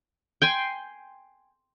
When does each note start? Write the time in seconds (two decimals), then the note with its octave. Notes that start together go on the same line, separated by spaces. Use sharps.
0.42 G5 G#5 C6